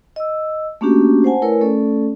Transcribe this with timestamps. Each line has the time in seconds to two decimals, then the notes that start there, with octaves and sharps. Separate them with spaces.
0.16 D#5 E6
0.81 A3 A#3 C#4 D4 F#4 G4
1.24 C5 F#5 G#5 A5
1.42 A3 E4 A#4 B4 C#5 G#5
1.61 A3 C#4 A4 D5